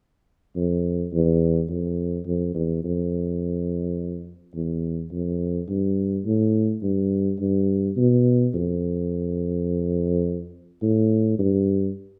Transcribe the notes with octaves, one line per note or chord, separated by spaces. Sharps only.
F2
E2
F2
F2
E2
F2
E2
F2
G2
A2
G2
G2
B2
F2
A2
G2